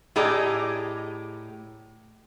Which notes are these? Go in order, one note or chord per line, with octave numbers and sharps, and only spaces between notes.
A2 G4 G#4 D5 D#5 A#5